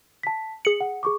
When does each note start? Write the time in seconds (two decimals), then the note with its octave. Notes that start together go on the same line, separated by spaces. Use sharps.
0.23 A5 B6
0.65 G#4 C#7 F#7
0.81 F#5
1.03 G#4 C#6 D6